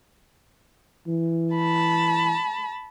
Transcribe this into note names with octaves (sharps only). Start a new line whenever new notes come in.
E3
A5 B5